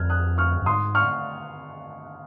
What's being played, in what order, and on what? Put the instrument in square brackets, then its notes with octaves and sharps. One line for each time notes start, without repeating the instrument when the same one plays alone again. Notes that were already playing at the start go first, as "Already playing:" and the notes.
Already playing: [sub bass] F2 [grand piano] F6 G#6
[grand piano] D#6 F#6
C#6 F6
[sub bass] F#2
[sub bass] G#2 [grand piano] C6 D#6
[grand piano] C#6 F6